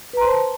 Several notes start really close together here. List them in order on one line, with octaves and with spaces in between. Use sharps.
B4 A#5 C6 C5 A5